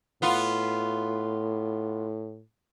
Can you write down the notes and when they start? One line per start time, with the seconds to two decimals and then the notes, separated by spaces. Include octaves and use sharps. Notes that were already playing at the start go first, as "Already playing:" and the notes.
0.22 A2 B3 F4